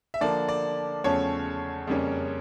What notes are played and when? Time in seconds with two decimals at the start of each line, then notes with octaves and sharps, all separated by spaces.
0.14 E5
0.21 D3 F3 A#3 D5
0.48 D5
1.04 E2 C#3 F3 A3 C#4 C#5
1.87 F2 C#3 G3 A#3 C#4